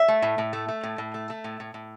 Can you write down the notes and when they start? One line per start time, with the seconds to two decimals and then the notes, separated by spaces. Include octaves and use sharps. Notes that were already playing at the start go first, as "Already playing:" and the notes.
Already playing: E5
0.08 A3
0.22 A2
0.38 A2
0.53 A3
0.68 A3
0.83 A2
0.98 A2
1.14 A3
1.30 A3
1.44 A2
1.60 A2
1.74 A2